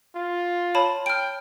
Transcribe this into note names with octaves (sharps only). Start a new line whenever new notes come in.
F4
C#5 A5 B5
G5 F6 D7